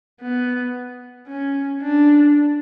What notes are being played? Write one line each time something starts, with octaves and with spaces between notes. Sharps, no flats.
B3
C#4
D4